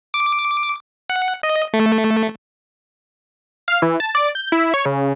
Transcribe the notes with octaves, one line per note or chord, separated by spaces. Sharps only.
D6
F#5
D#5
A3
F5
E3
A5
D5
G6
E4
C#5
C#3